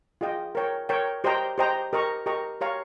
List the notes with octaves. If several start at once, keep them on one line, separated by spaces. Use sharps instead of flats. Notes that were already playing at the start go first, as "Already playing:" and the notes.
F4 G#4 D#5 G5
A#4 C#5 G5
A#4 C#5 G5
G4 C5 D#5 G5 A#5
G4 C5 D#5 G5 A#5
G4 A#4 D#5 A#5 C#6
G4 A#4 D#5 A#5 C#6
G4 C#5 F5 A#5 C#6